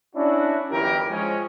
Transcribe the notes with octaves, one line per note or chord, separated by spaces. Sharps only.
C#4 D4 E4 F#4
G1 F#2 E3 E4 G4 A#4
F3 G#3 C#4